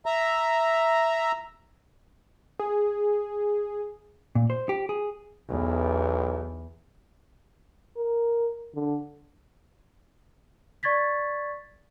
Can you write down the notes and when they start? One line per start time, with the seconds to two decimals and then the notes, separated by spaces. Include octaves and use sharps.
0.06 E5 A#5
2.59 G#4
4.35 A#2
4.50 C5
4.69 G4
4.89 G#4
5.49 B1 E2
7.97 A#4
8.74 D3
10.83 D5 C#6 G#6 A6 B6